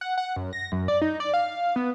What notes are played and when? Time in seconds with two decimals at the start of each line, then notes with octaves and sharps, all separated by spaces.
0.01 F#5
0.18 F#5
0.36 F#2
0.53 A#6
0.72 F#2
0.88 D5
1.02 D#4
1.20 D5
1.34 F5
1.76 B3